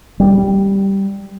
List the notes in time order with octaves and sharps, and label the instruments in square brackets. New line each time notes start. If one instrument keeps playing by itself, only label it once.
[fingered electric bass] G3